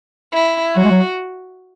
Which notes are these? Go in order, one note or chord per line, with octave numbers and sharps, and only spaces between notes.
E4
F#3 F#4
G#3
F#3